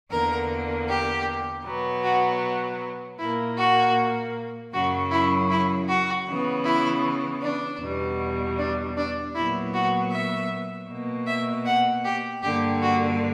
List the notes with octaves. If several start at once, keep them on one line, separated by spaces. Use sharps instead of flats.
E2 D3 A#3 A#4
G4
B2 F#3 B3
F#4
A#2 A#3 E4
F#4
F#2 C#3 F#3 F#4
E4
E4
F#4
C#3 E3 B3
E4
D4
E2 B2 G3
D4
D4
A#2 F#3 B3 E4
F#4
E5
B2 A#3
E5
F#5
G4
G2 D3 A#3 G4
F#4